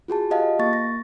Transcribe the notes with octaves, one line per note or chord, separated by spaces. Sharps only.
F4 F#4 G#4 A5
F4 G4 D#5 F5 F#5 A5
A#3 C#6 A6
A#6